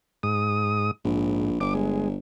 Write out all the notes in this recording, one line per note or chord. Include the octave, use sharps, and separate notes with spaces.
G#2 D#6
A#1 G#2
G1 D6
G#3